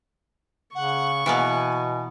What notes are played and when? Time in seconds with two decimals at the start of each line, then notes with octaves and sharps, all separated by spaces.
0.75 C#3 F#5 C#6
1.26 B2 E3 A#3 B3 G#5